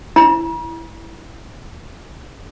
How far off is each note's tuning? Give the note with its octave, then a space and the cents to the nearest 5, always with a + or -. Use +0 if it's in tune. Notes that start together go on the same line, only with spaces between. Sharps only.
E4 +0 A#5 +45